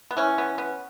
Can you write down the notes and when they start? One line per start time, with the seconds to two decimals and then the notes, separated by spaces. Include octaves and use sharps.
0.11 B3
0.17 E3 C#4
0.38 B3
0.58 B3